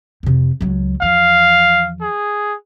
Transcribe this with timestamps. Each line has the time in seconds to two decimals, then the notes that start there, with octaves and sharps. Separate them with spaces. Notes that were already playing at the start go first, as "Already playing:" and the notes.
0.23 F2 C3
0.61 C#2 F#3
1.02 E2 F3 F5
2.01 G#4